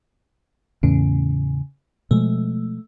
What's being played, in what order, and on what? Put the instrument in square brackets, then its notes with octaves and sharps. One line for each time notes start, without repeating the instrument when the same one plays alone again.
[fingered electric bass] E2 A2 [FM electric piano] C#3
[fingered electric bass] B2 F3 G#3 [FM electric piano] A3